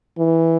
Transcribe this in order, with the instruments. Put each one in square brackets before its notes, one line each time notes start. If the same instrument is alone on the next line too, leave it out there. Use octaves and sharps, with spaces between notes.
[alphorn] E3